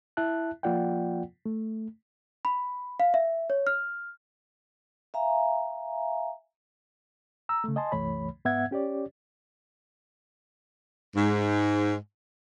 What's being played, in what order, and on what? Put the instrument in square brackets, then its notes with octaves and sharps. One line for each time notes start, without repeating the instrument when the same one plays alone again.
[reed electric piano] E4 E5 A5 F#6
F3 A#3 F4 D5 F#5 G5
A3
[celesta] B5
F5
E5
C#5
F6
[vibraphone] E5 F5 G#5 A#5
[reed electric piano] A#5 E6
C#3 A3
D#5 G#5 A5 C6
C2 F#2 E3 A3 C#5 B5
G#2 B3 E5 F#5 G#6
C#4 G4 C#5 D5
[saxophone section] G#2